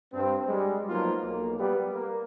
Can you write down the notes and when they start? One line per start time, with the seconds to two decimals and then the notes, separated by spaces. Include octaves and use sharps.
0.13 G2 C4
0.48 G3 G#3
0.89 F3 F#3 A#3 B3 D#4 F4
1.22 B1 A#3
1.58 G3 B3
1.93 A#3